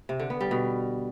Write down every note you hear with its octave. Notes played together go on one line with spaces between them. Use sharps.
C3
D3
B3
G3
B2